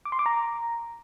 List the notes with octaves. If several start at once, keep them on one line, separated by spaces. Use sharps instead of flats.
D6
C6
D6
A#5